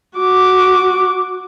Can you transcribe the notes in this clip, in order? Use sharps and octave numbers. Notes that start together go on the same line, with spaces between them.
F#4 D6